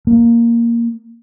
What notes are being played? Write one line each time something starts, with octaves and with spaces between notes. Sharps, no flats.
A#3